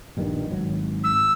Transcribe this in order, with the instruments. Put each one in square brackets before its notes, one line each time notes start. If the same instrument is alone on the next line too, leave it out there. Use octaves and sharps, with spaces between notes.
[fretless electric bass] A#1 G2 D#3
G#1 F#3
[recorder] E6